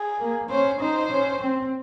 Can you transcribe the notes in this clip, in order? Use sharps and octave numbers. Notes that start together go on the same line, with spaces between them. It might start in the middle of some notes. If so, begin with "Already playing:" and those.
Already playing: G#4
A#3
C#4 C5
D#4 C5
C#4
C4